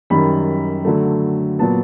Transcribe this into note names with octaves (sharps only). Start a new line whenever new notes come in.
F#2 D#3 G3 B5
D3 F#3 A3
A#2 F#3 B3 A5